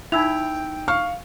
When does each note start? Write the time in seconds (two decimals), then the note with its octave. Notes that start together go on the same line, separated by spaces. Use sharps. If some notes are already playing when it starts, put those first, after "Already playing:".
0.12 D#4 E4 G5 E6 F7
0.88 F5 C#6 F6